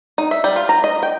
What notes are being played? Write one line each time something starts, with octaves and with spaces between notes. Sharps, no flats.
D#4
E5
G3
F4
A#5
D#5
G5